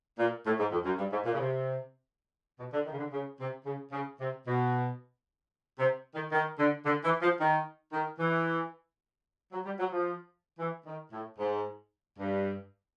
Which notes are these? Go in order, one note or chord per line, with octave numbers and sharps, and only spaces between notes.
A#2
A2
G#2
F2
F#2
G2
G#2
A#2
C#3
C3
B2
D3
D#3
C#3
D3
C#3
C3
C#3
C#3
C3
B2
C3
D#3
D#3
D3
D3
E3
F3
D#3
D#3
E3
F#3
G3
F#3
F3
E3
D#3
A2
G#2
G2